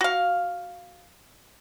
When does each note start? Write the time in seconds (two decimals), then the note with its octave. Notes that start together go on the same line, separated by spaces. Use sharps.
0.01 F#4 F5